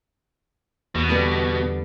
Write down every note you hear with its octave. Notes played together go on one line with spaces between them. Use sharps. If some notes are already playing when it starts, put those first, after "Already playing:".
E2 B2
D3 G3 B3